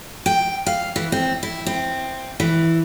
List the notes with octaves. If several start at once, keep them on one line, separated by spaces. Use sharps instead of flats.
G5
F5
E3
C4
E4
C4
E3